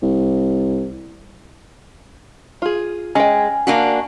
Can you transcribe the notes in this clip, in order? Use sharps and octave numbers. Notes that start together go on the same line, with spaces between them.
C2
F4 G#4
G#3 C#4 G5 G#5
A#3 D4 F#4